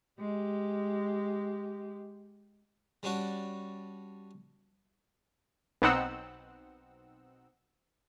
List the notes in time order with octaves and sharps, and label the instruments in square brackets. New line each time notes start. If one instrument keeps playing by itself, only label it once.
[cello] G#3 G4
[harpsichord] G3 C#4 D4 F#4
[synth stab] B1 B2 C4 D#4 F#5 E6